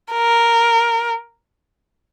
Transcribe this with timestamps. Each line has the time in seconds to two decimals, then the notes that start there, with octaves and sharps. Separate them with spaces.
0.12 A#4